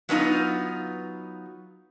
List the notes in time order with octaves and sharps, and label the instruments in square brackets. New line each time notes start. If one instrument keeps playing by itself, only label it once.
[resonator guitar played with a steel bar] F#3 B3 C#4 D#4 F4